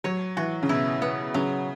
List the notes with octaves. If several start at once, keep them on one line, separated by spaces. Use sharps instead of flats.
F#3 C#5
E3 F#4
C#3
B2 E4
B3
C#3 F#3